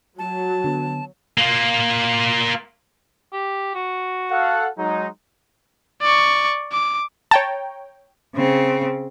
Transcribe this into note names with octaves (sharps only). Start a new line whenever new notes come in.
F#3 A5
D3 B3
A#3 F4
G4
F#4
A4 F5 F#5
F#3 G#3 D#4
D5 C#6
D6
C#5 G5 A5 A#5
C#3 C4